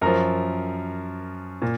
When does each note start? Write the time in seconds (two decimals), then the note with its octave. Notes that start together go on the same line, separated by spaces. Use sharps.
0.02 F#2 F3 A#4
1.62 A#2